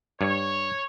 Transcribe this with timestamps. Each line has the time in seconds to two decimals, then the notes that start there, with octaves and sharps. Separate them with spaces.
0.21 G2 C#5